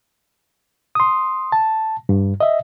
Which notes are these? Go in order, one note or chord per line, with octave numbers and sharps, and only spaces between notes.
C6 D#6
A5
G2
D#5 E5